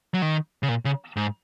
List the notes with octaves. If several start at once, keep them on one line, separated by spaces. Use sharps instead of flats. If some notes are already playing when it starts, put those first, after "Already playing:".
F#3
D#3
C#3
A#2
C#3
G#2